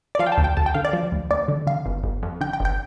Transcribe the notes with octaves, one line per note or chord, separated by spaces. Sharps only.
D5
F3 F5
G5
A5
D2
G5
D2 A5
G5
D3 F5
D5
F3
D2
D2 D5
D3
D3 F5
G1
G1
F2
D3 G5
G5
G1
G5